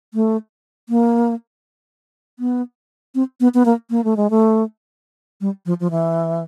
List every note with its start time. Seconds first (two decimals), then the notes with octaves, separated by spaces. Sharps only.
0.14 A3
0.89 A#3
2.39 B3
3.15 C4
3.40 B3
3.54 B3
3.65 A#3
3.90 A#3
4.04 A3
4.17 G#3
4.30 A3
5.41 G3
5.66 F3
5.80 F3
5.91 E3